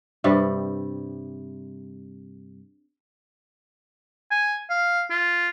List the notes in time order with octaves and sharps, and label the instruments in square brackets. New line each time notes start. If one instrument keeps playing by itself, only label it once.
[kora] G2 C3 G3
[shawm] G#5
F5
F4